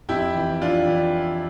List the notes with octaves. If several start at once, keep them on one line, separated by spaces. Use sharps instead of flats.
F2 E4 G4
E3
F2 D4 F4
E3